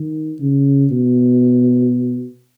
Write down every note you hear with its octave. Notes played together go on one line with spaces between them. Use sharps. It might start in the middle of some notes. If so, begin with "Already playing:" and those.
Already playing: D#3
C#3
B2